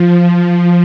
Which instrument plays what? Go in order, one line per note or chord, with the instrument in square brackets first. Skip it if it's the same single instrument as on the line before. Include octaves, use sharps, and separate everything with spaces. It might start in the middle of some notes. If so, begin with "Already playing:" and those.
Already playing: [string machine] F3